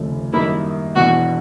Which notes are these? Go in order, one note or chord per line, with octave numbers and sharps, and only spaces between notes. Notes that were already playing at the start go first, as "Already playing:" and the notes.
Already playing: F1 D#2 C#3 F3 A3
F#2 D#3 G3 A#3 D#4 E4
E1 E2 B2 F#4